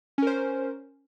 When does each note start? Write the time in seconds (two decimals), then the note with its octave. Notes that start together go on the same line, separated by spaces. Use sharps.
0.18 C#4
0.22 A#4
0.27 C5